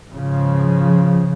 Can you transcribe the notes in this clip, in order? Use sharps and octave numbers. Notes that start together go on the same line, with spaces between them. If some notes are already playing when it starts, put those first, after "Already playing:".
G#2 C#3 F3